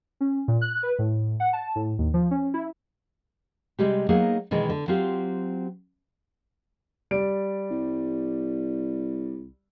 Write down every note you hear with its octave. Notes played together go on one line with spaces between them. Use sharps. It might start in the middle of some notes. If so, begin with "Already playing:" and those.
C#4
A#2
F#6
B4
A2
F#5
A5
A2
D#2
F3
C#4
E4
C3 G3 G#3 G4
F#3 A#3 B3 D#4 G#4
B2 D#3 E3 G#3
D3
F#3 C4 F4 G4
G3 D5 D7
C2